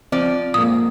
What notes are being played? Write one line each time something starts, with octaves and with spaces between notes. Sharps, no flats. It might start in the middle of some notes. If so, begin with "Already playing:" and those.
F3 C4 D5
F2 G#2 A#3 F4 D#6